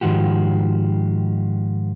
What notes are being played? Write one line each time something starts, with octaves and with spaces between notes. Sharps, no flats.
G#2 D#3 F3 F#4 G4